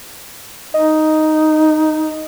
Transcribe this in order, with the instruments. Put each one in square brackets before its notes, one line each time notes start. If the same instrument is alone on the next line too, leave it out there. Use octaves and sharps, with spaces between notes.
[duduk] D#4 [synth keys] D#5